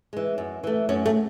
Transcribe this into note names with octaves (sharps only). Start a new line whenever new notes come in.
E3 G#3
F#2
E3 A3
F#2 C#4
A3